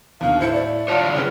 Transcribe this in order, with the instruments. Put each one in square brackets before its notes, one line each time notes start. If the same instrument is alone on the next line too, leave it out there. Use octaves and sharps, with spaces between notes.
[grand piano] D#2 B2 D3 [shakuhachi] F5
[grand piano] A2 E4 C#7 [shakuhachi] C5
[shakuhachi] D5
[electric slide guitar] F#2 F4 C#5 [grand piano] F5 A5 F#6
[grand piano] C#3 C#4 B4